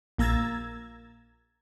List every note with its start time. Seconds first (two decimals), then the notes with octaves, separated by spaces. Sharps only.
0.18 A#1 A#3 A#5 E6 G#6 A6